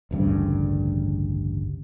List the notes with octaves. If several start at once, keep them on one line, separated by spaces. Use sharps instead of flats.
A1 D2 G2 C#3